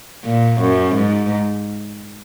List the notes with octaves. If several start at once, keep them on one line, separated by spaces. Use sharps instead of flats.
A#2
F#2
G#2